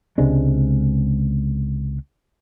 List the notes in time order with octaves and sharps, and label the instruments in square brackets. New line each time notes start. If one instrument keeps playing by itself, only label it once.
[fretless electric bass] C#2 C3 G#3 D4